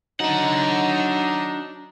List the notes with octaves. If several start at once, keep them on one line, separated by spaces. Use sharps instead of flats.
F#3 D4 D#4 F#5